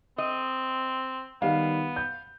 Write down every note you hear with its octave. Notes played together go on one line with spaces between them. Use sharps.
C4 D#5
D#3 G3 B3 F5
G6